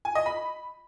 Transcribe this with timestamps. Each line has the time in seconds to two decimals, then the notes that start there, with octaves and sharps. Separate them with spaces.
0.05 G#5
0.15 D#5
0.26 B5